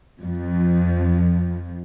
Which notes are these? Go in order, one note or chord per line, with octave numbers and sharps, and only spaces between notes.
F2 F3